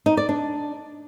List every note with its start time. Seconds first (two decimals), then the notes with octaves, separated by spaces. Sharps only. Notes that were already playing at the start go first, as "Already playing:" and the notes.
0.06 D#4
0.17 D5
0.29 D4